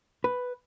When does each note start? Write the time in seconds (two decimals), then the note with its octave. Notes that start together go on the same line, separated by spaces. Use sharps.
0.24 B4